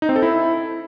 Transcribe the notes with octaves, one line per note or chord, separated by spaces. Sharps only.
D#4
C4
A4
E4